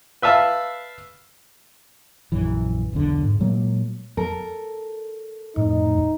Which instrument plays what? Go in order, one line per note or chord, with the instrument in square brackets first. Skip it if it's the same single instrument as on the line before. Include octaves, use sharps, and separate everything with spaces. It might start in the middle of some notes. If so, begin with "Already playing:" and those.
[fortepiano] B4 E5 F5 A5
[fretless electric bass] A#1 F#2 E3
E1 B1 E2 D3
G#2
A#2 F#3 G#3 A#3
[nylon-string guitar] A4 A#4
[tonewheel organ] F2 A2 [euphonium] D#4